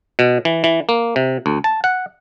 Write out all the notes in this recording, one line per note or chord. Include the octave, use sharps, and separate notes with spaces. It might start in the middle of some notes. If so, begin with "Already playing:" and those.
B2
E3
E3
A#3
C3
D2
A5
F#5